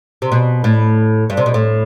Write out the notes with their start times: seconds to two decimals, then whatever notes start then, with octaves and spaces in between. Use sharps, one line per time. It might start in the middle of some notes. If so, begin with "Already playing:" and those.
0.22 C3
0.32 B2
0.64 A2
1.30 G2
1.37 C3
1.46 B2
1.54 A2